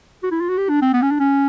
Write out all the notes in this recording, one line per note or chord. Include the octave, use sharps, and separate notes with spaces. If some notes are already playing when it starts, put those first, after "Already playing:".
F#4
E4
F4
F#4
G4
D4
C4
B3
C#4
D4
C#4